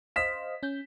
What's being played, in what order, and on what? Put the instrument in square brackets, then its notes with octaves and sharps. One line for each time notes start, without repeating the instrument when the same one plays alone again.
[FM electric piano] C5 D#5 F5 [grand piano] B6 E7
[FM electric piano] C#4 G6